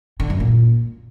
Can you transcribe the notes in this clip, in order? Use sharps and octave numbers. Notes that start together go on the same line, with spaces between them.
D3
F#2
A#2